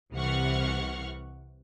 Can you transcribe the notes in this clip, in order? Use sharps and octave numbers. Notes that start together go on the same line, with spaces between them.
C2 C3 E3 F#5 C#6 F6